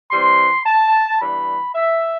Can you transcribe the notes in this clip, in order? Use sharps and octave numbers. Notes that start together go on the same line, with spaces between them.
E3 G3 C4 C6
A5
E3 G3 B3 D4 B5
E5